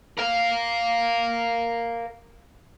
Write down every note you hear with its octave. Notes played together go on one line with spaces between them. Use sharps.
A#4 F5